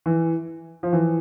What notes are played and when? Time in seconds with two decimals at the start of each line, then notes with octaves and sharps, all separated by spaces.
0.06 E3
0.83 F3
0.93 E3